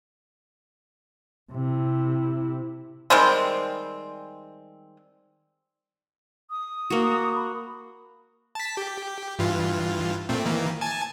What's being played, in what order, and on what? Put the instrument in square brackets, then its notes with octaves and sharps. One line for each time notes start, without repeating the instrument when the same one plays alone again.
[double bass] C3 E4
[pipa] D#3 G3 G#3 C4
[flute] D#6
[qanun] A#3 F#4
[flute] B5
[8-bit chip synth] A5 B6
G4
G2 E3 F4
A#2 A3 C4
D#3 E3 A#3
G#5 A5